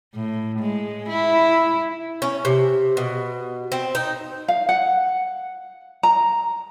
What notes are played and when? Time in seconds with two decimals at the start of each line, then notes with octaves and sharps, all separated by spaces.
0.15 A2
0.58 G#3
1.09 E4
2.22 C#4
2.45 C3
2.97 B2
3.72 C4
3.95 D#4
4.48 F5
4.69 F#5
6.03 A#5